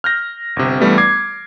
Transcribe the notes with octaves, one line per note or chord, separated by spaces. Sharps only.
F6 G6 A#6
G1 C3
G2 E3 G3 A3 B3
D6 G#6 C7